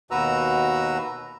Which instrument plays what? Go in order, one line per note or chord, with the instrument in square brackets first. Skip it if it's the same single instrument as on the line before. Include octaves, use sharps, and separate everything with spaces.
[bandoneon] D#2 B2 F#4 B4 A#5 E6